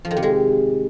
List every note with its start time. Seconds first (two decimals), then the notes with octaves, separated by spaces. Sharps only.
0.05 F3
0.11 D#3
0.17 C3
0.23 G#3